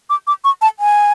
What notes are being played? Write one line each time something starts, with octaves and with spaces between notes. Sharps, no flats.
D6
D6
C#6
A5
G#5